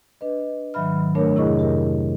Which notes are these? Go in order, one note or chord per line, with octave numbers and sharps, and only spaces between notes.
D4 B4 D#5
G#2 D#3 F#3 E5 B5 F6
A3 D4 A#4 C#5
F2 C3 E4 G#4 D#5 C#6
G4 A#4